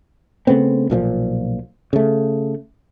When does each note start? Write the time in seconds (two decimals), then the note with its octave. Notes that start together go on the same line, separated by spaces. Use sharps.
0.47 C#3 A3 B3 C4
0.90 B1 A#2 E3 F3
1.93 C#3 A3